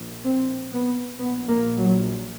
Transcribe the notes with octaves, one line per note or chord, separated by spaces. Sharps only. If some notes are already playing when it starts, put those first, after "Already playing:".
Already playing: A#1 A#2
C4
B3
A#1 A#2 B3
A#3
F#3